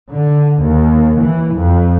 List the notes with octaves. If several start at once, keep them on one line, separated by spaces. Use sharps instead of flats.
D3
D#2
E3
F2